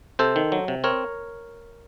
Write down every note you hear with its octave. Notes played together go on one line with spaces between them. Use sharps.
C3 A4 C5
D#3
F#3
C3
C4 A#4 C#5